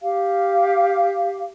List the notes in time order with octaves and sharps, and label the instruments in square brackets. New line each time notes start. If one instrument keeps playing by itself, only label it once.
[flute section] G4 F5